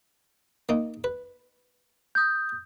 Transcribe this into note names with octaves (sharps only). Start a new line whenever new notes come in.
A#3 D#4
B4
D#6 G6